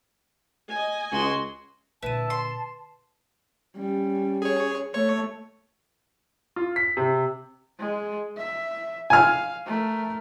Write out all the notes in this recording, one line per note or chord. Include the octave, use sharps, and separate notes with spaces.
D#5 G#5
C#2 F#4 C6
A#2 D3 E4 B4 A5 D#7
C6
G3 C#4
G#4 C#5
A3 C#5
F4
B6
C3
G#3
E5
F5 G#5 F6
A3 A#4